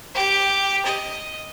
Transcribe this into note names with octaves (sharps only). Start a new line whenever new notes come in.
G4
D#5